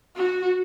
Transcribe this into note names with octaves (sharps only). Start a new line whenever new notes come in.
F#4